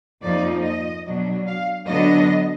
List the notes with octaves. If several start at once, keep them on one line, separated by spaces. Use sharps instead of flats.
F2 F3 A#3 D#4 D5
D#5
B2 F#3 D4
F5
D3 F#3 B3 D4 D#5